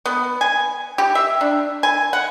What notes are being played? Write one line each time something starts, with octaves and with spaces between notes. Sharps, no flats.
B3
G#5
G4
E5
D4
G#5
F#5